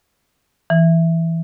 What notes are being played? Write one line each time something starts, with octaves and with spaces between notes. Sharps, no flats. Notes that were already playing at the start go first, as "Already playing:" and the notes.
E3